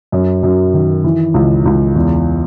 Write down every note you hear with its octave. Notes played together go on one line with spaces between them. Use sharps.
F#2
F#2
D#3
E3
C#2
C#2
E2